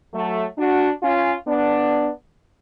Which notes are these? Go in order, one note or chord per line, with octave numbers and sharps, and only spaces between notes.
F#3 A3
D4 F#4
C#4 F4
B3 D4